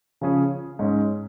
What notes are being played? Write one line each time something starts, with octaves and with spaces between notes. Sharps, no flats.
C#3 F3 C#4 G#4
G#2 G#3 C#4